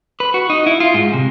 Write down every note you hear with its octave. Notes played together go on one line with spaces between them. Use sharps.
B4
F#4
D#4
E4
F4
G#2
C3